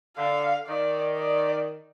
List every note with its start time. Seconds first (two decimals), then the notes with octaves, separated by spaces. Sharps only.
0.17 D3 F5
0.67 D#3 D5
1.17 D5